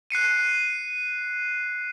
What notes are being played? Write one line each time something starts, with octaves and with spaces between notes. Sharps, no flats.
F#6 C7 C#7 D#7